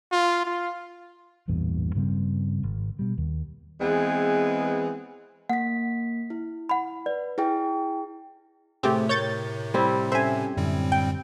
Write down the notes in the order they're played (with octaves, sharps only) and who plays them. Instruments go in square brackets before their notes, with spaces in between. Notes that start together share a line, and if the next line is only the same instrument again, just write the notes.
[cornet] F4
F4
[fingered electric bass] A1 E2 G2 A#2
G2 C#3 G3 C4
G#1
B2 G3
D#2
[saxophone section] E3 G#3 B3 C4 G#4
[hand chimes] A#3 B6 [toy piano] F#5
[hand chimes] E4
[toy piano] F#5 B5
[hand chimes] B4 [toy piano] D5
[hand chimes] E4 G#4 G5
[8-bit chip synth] A2 C3 [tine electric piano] A3 G#4 [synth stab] C4 G4
[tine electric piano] A#4 [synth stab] C#5 G6 A6
[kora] G3 C4 E4
[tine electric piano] C#4 A4 [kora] C5 [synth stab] E5 G#5
[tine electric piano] F#2 D3 [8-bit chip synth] A2 G3 C4
[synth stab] G5